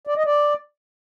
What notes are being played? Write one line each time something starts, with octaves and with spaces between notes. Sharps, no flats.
D5
D#5
D5